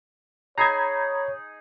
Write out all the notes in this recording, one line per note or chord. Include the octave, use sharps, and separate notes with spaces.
D#4 G#4 C#5 A#5 B5 G#6